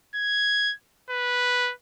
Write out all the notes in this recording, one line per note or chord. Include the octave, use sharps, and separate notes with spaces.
G#6
B4